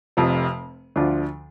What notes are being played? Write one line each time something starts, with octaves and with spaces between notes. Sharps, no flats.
F1 F2 C3 F3
D2 D3 F3 D4 F4